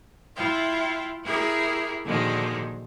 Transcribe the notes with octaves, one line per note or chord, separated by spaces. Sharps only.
E4 F4 E5 G5
E4 G4 G#4 A#4 E5
A#2 D3 D#3 F3 F#3 G#3